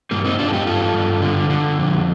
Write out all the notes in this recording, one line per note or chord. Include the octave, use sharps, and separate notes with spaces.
G2 G3 A#3
C4 D#4
G2 D4 F4
A4
D#4 G4
G2 F4 A4
G2
D3
D3
F2